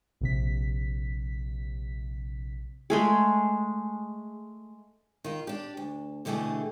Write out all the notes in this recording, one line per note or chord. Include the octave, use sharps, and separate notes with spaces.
A#1 C3 B6
G#3 A3 G#4
D#3 F4
D4 G4
D2
B2 D3 E3 A3 G4 G#4